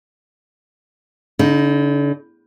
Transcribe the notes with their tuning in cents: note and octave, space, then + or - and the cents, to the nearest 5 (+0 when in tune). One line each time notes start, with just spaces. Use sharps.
D3 -45 D#4 +0